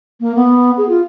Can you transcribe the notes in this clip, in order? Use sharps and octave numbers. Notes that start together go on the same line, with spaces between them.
A#3
B3
G#4
F4